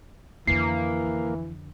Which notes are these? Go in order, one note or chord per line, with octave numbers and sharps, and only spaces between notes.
F2 D3 E3 A#3 C7